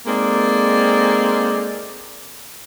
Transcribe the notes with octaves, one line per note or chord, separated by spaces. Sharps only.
G#3 A#3 C4 D#4 A4 D5